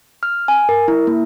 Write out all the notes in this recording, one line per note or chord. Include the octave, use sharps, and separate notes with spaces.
F6
G#5
A#4
E4
A#3